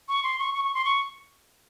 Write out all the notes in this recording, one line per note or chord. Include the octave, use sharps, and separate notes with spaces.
C#6
C6
C#6
C#6
C#6
C6
C#6